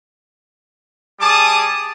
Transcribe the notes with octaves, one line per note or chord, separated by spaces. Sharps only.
G3 G#4 A5 D6 D#6